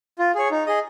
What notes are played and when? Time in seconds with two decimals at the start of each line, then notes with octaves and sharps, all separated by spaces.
0.19 F4
0.35 G#4 C#5
0.51 D#4
0.66 G#4 D#5